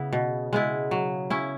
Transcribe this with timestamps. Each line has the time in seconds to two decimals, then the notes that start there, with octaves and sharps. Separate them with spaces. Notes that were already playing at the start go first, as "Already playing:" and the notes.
Already playing: C#3 B3 E4
0.13 B2
0.53 G#3 B3 E4
0.91 F#3
1.30 C#4 E4